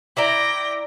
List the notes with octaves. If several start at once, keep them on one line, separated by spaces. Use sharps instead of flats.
E4 D5 G5 A#5 A#6